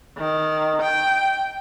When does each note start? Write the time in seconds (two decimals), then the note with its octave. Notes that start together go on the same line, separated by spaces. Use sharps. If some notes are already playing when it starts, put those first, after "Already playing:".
0.18 D#3
0.81 G5